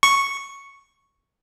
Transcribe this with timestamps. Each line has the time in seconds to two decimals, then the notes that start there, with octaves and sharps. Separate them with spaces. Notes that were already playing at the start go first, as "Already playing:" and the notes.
0.03 C#6